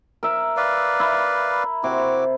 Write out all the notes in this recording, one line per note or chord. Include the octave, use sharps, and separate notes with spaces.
A#4 E5
B4 D5 F5
E4
C3 E4 F#4 D6